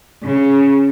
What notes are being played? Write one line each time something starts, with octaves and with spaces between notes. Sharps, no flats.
C#3